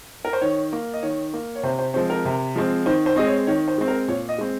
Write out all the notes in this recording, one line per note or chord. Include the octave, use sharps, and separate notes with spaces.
A#4
C5
D#3 C#5
A#3
D#5
D#3 C#5
A#3
C#5
C3 C5
C5
F3 G#3 C4 C5
A#4
C3
F3 G#3 C4
D#3 C5
C5
G#3 C4 D#5
C#5
D#3 C#5
C5
G#3 C4
A#4
A#2 C#5
D#5
G#3 C4